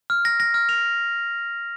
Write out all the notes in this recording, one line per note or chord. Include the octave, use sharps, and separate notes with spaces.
F6
A#6
A#6
F6
F7